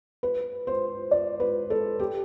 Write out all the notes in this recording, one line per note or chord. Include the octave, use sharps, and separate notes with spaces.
B4
C5
D5
B4
A4
G4